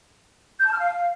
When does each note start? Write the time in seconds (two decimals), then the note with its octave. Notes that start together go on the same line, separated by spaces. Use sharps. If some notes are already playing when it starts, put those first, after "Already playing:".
0.59 G6
0.66 A5
0.72 F6
0.78 F5